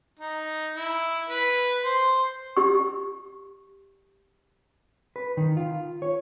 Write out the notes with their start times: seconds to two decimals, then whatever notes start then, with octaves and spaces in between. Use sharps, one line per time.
0.19 D#4
0.76 E4
1.28 B4
1.83 C5
2.57 G4 C#6
5.16 B4
5.37 D#3
5.57 F4
6.02 C#5